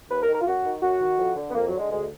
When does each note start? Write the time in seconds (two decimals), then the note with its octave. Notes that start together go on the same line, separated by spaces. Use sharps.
0.10 D#2 B4
0.22 A#4
0.28 D#3
0.34 A#4
0.41 F4
0.46 F#2 F#4
0.64 D#3
0.82 F#2 F#4
1.00 D#3
1.19 F2
1.37 D3
1.50 B3
1.55 F2 A#3
1.67 F#3
1.73 D3
1.79 G#3
1.90 D2 G#3